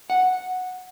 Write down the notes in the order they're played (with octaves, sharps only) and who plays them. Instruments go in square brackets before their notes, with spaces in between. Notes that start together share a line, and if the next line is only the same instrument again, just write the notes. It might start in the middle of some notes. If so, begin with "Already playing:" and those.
[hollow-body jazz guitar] F#5